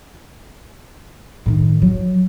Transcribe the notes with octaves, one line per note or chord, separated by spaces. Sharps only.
A2 D#3
F#3